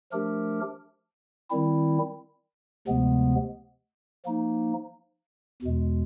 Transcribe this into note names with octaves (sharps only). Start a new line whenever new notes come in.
F3 A3 D4 G4 A#4
D#3 G3 C4 E4
D2 C3 F3 G#3 B3
F3 A#3 D#4
E2 B2 G#3